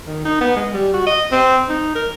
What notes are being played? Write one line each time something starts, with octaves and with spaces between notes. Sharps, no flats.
D#3
D#4
B3
G#3
G3
F#4
D#5
C4
D#4
A#4